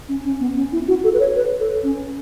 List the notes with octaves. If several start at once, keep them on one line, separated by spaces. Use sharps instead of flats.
C#4
C#4
B3
C#4
E4
F#4
A4
B4
C#5
B4
A4
C#4